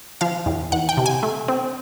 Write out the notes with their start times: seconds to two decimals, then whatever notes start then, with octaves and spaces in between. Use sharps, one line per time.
0.21 F3 F5
0.46 E2
0.72 E2 F#5
0.89 G5
0.97 C3
1.06 G#5
1.23 A3
1.48 C4